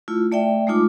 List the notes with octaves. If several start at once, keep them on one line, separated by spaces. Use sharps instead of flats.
A3 E4 F4
A3 D5 E5 G5
G#3 A3 D#4 F4 D6